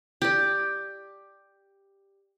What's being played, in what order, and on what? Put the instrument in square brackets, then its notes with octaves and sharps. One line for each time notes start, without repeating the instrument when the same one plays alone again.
[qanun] G4 D5